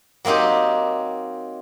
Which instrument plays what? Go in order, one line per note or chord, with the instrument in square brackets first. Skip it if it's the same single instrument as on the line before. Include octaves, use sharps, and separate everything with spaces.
[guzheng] F#3 A#3 C4 D#4 G4